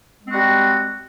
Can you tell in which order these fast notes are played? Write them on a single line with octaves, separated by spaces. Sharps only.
G#3 C4 F#4 G3